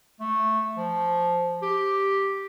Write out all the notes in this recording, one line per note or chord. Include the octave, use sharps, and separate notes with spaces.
A3
F3
G4